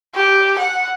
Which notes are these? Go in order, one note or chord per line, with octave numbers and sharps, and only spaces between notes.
G4
F#5